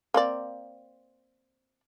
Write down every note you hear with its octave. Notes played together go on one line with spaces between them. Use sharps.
A#3 C4 D5